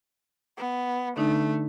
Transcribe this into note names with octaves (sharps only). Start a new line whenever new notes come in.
B3
D3 A3 D4 D#4